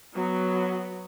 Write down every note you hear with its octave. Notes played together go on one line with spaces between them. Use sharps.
F#3 B3